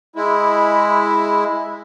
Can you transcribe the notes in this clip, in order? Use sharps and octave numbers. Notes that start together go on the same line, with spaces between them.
G#3 E4